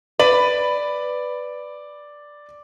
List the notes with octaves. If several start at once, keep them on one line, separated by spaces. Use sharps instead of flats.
B4 D5 F#7